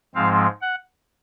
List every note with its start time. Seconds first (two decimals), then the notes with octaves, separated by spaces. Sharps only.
0.15 G#2 F3 G#3 C4 F5
0.61 F#5